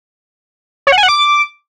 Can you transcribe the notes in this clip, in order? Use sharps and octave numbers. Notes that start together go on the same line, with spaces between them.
C#5
F#5
G#5
F#5
D6